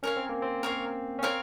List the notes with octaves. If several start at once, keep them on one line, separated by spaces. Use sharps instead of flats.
C#4 A#4 C#5 F5
C4
A#3
C4
A#4 C#5 F5
C#4
C4 A#4 C#5 F5